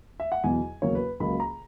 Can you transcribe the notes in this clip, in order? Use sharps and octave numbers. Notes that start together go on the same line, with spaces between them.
E5
F#5
E2 B2 F#3 G#5
E2 C#3 F#3 A#3 C#5
B4
C#2 C#3 F#3 A#3 B5
A#5